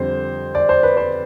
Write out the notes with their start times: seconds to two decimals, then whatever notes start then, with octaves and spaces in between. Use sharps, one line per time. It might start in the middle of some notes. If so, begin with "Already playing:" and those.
Already playing: F2 D3 G3 C5
0.55 D5
0.69 C5
0.83 B4
0.97 C5